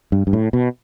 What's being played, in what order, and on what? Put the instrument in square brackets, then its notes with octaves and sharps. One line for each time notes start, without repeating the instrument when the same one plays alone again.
[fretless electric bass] G2
G2
A2
B2